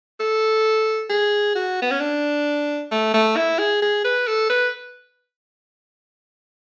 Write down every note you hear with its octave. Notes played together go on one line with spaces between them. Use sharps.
A4
G#4
F#4
B3
C#4
D4
A3
A3
E4
G#4
G#4
B4
A4
B4